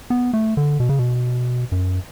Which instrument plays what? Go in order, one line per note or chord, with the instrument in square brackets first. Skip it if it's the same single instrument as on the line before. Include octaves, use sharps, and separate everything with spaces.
[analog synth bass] B3
A3
D3
B2
C#3
B2
F#2